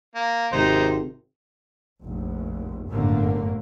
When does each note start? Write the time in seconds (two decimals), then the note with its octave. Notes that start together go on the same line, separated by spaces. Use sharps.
0.15 A#3
0.52 G#1 C3 D#4 C5
2.04 F1 A#1
2.88 G1 F#2 A2 D3 A3 A#3